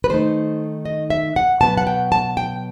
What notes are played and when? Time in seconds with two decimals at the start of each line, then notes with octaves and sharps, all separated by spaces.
0.04 B4
0.09 D#3 A3 D#4 C5
0.85 D#5
1.10 E5
1.36 F#5
1.61 B2 F#3 B3 A5
1.78 F#5
1.87 G5
2.12 A5
2.37 G5